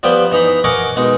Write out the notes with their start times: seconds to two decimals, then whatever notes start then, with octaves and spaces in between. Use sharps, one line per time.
0.03 F3 G3 B3 G4 G5
0.32 E3 D#4 A#5 B5
0.64 A#4 D#5 F#5 G#5 C#6 D6
0.96 B2 G#3 D#4